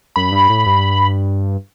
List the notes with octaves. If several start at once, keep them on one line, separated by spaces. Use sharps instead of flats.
F#2 B5
G2
A2
G2